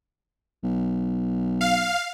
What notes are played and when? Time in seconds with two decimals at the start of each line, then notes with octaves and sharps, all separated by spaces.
0.63 B1
1.61 F5